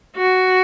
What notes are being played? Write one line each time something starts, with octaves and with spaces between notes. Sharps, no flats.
F#4